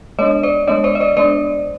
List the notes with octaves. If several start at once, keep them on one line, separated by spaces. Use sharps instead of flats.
G#3 B3 D4 C#5 D#5
C5 D5
G#3 B3 D4 C#5 D#5
C5 D5
D#5
C5 D5
G#3 B3 D4 C5 D5